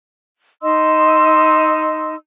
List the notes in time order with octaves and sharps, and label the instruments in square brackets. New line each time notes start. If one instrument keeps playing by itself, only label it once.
[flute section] D#4 D#5 C6 E6